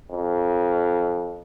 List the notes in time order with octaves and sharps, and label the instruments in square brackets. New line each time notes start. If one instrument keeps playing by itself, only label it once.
[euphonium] F2